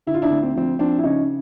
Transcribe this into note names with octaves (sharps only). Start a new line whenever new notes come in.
D3 E4
F4
D4 E4
D2
C4
F3 C4
F3 C4 D4
E4
C#3 C#4 D#4